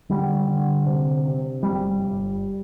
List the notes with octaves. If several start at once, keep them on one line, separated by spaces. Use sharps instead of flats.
D3 G3
D3
C3
C3
G1 G3
G1